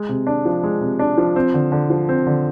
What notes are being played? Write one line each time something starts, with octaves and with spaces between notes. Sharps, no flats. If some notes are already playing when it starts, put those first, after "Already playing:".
Already playing: G#3
C3
D4
F3
G#3
C3
D4
F3
C4
D3
D3
F3
C4
D3